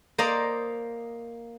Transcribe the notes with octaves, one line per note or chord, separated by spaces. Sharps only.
A#3 C5 D5 D#5 A#5